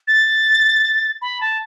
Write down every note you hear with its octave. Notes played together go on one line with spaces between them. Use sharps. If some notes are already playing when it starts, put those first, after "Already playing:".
A6
B5
A5